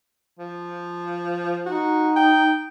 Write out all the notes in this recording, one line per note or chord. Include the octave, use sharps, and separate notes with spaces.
F3
D#4 F#4
G5